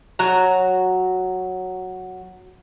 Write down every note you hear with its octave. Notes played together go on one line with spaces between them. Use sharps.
F#3 F#4 A#5